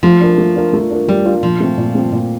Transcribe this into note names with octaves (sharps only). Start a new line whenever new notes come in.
F3 A3
D4 F4 A#4
A3
D4 F4 A#4
A3
D4 F4 A#4
G3 A3
D4 F4 A#4
A#2 F3
A3 C4
A#2
A3 C4
A#2